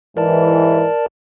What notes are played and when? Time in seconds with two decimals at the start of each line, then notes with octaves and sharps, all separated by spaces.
0.17 G#2 E3 A#4 D5 A5